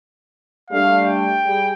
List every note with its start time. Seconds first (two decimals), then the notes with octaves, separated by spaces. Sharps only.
0.71 G3 A3 D4 F5
1.05 G5
1.46 G3 G#4